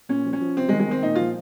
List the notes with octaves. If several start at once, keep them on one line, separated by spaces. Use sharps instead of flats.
A#2 C#4
F3
C#4
F3
C3 C4
G#3
D#3
G#3
D#3 C4
A#2 D#4
F3 F4